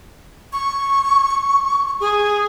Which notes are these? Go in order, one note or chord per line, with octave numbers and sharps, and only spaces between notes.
C#6
G#4